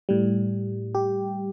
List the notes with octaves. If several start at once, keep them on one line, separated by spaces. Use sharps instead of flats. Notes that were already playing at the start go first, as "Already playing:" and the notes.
A2 G3
G4